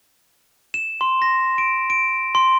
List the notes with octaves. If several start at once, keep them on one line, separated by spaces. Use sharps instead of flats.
E7
C6
A#6
D7
D7
C6